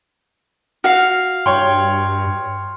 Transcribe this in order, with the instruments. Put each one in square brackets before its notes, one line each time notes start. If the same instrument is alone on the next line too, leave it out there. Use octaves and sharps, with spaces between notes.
[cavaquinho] F#4 F5 [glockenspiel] F6 C7 F7
[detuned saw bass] G2 [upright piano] C#5 G5 [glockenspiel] C6